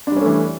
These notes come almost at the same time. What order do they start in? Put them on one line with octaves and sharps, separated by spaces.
D4 G3 C#4 A3 E3